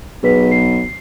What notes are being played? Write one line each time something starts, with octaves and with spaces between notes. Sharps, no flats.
B1 G#4 B4 B6
C7